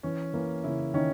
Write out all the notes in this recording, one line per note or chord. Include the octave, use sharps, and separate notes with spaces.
E3 C#4
E3 A#3
C#3 E4
D#3 C#4